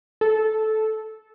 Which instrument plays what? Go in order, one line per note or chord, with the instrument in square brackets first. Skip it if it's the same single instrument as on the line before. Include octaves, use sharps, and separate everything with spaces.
[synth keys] A4